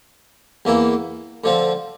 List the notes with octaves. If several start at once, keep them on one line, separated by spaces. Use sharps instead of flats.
E2 E3 A#3 E4
D3 F3 C4